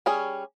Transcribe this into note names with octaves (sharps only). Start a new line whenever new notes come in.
G3 C#4 G#4